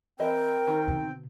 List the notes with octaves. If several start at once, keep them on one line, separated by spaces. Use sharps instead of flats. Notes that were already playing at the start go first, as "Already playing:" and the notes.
E3 C4 A#4 D#5 E5 G5
D#3
B2 D3